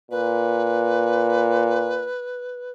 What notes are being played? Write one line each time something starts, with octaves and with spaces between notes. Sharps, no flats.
A#2 B4